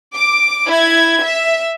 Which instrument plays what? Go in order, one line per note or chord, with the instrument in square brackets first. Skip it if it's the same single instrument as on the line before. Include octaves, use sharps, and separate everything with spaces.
[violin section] D6
E4 G#6
E5